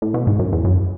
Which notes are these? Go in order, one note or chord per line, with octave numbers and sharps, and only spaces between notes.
A2
B2
G#2
F#2
E2
F#2